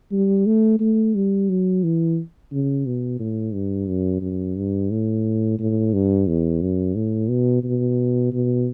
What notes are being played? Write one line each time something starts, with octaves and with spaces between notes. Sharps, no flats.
G3
A3
A3
G3
F#3
E3
C#3
B2
A2
G2
F#2
F#2
G2
A2
A2
G2
E2
F#2
A2
B2
B2
B2